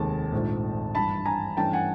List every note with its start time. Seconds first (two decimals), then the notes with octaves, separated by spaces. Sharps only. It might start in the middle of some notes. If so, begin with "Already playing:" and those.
Already playing: F1 D#2 D#3 G#3 A5
0.32 A#1 G#2 F3 A3
0.95 G2 E3 G3 A5 B5
1.25 G#5 A#5
1.57 G2 E3 A3 C#4 G5 A5
1.73 F#5 G#5